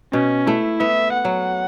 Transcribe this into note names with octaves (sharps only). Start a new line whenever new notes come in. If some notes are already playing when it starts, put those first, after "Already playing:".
B2 C#4
A3 E4
B3 E5
F#5
F#3